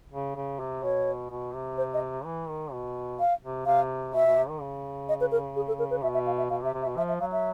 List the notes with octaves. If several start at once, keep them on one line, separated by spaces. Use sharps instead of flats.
C#3
C#3
C3
B2 C#5
B2
C3
C5
D#5
E3
D#3
B2
F5
C3
C3 F5
B2 E5
B2
C3
D#3
C#3
D#5
B4
A#4
G#4
A4
A#4
B4
B2 E5
E5
F5
E5
B2 F5
C3
E5
C3
E5
B2
F3 E5
E5
F#3 F5
E5